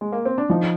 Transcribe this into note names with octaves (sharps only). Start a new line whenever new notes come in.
G#3
A#3
C4
D4
F3 D#4